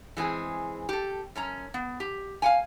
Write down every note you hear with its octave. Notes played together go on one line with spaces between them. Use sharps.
E3 G#3 C4 G#4
G4 A4
F#2 C#4 A#5
B3
G4
F5 F#5 G#5